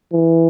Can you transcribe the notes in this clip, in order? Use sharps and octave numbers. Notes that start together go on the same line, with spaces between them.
E3